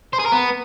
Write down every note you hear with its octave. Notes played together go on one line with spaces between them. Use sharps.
C5
G#4
A#4
B3